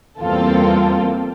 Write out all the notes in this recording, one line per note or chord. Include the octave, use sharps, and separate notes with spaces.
E2 G3 A#3 C4 F4 A4